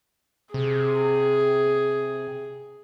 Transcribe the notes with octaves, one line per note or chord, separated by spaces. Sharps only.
C3 G#4